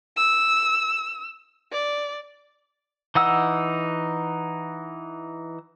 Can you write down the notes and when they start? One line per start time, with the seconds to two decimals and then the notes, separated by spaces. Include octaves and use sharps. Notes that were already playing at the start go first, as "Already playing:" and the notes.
0.16 E6
1.72 D5
3.15 E3 D#4 F#5 E6